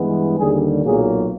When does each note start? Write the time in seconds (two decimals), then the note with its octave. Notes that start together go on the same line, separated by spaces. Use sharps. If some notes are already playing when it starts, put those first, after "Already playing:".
Already playing: G2 E3 G#3 B3
0.38 D#2 D3 G3 G#4
0.84 B1 A#2 F#3 A#3 G#4